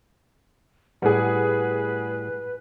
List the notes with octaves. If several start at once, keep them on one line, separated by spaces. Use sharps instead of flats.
A2 G3 G#4 B4 F#5